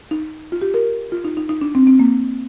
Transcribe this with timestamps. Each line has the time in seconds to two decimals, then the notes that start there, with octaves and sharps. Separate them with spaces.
0.11 D#4
0.52 F4
0.61 G4
0.74 A#4
1.12 F4
1.24 D#4
1.37 D#4
1.49 D#4
1.61 D4
1.75 C4
1.87 C4
1.99 A#3